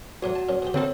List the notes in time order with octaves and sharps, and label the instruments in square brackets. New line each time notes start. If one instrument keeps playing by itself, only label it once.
[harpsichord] E2 A2 F#3 [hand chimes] F#4
[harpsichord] A5
A#2 F#3 C#4
B2 G#3 G4
[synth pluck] D3 C4 A4 [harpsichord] E3 A#4 [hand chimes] C#5